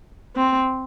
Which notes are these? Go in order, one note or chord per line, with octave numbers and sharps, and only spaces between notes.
C4